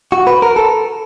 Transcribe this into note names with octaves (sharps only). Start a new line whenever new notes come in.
F#4
B4
A#4
A4